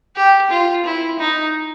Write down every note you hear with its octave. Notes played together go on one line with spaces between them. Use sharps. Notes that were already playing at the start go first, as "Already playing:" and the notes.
G4
F4
E4
D#4